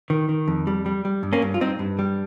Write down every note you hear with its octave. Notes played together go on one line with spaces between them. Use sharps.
D#3
D#3
F2
G3
G3
G3
G2
A#3 C#4
G2
F4
G2 C4 D#4
G2
G3